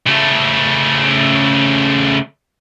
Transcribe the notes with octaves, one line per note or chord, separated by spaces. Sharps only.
C#3 A3